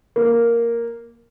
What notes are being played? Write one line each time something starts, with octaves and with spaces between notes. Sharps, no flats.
A#3